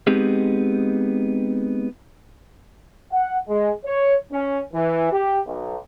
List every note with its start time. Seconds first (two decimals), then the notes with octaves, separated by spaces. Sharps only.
0.07 G#3 B3 C4 D#4 G4 G#4
3.12 F#5
3.48 G#3
3.85 C#5
4.31 C#4
4.73 E3
5.12 G4
5.47 B1